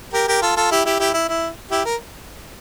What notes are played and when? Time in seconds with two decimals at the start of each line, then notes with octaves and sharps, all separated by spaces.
0.13 G4 A#4
0.28 G4 A#4
0.42 F4 A4
0.56 F4 A4
0.71 E4 G4
0.85 E4 G4
1.00 E4 G4
1.14 E4
1.29 E4
1.71 E4 G4
1.85 A#4